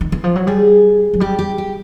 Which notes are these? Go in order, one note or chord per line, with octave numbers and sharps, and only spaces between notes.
D#3
E3
F3
F#3
G3 G#4
F#3
G3 G4
G4
G4